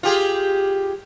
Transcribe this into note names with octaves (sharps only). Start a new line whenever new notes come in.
F4 G4 G#4